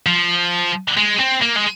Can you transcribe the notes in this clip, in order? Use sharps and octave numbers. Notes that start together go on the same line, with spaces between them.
F3
G#3
C4
A#3
G#3